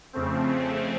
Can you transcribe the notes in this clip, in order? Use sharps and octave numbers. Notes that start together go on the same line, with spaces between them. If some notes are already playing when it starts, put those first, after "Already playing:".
F2 C#3 A3 C4